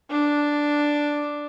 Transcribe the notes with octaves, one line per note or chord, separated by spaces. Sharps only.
D4